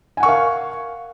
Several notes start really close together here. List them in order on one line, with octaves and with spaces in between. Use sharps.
G#5 F#5 C#6 A#4 F5